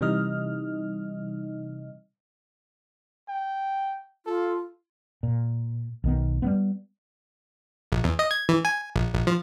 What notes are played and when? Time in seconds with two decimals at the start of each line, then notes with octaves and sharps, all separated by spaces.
0.01 C3 E3 G3 D#4 D#5 F6
3.29 G5
4.26 F4 A4
5.23 A#2
6.04 B1 D#3 B3
6.42 G3 A#3 B3
7.92 A#1
8.04 E2
8.19 D#5
8.31 G#6
8.49 E3
8.65 G#5
8.96 A#1
9.14 A#1
9.27 F3